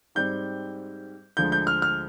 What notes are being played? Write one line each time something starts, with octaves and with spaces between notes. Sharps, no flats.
G#2 G3 C4 G6
D2 D3 F3 G#3 G6
G6
F6
F6